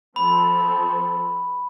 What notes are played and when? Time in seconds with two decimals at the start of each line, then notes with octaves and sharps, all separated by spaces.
0.16 F3 C4 A4 B5